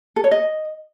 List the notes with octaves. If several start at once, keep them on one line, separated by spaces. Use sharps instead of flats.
A4
C#5
D#5